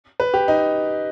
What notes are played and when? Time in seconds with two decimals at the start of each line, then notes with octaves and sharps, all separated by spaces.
0.20 B4
0.34 G4
0.48 D#4